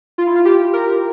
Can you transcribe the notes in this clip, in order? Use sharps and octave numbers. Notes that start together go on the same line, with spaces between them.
F4
E4
F4
G4
A#4